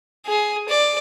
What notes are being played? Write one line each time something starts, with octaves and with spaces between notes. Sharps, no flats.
G#4
D5